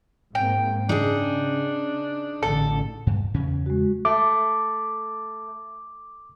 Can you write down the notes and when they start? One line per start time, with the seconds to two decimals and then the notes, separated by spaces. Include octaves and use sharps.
0.35 G#2 A#3 C4 G5
0.89 C#3 D4 D#4 G#4
2.43 A1 D3 A4
3.07 G2
3.34 E2 C#3 C#4
3.66 G#3 F#4
4.05 A3 D6